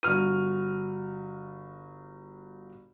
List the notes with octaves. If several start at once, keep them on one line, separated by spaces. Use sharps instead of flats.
G1 F#4 F6 D#7